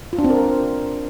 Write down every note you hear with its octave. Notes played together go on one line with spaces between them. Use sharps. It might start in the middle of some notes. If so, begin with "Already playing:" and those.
F4
D4
C4
A#4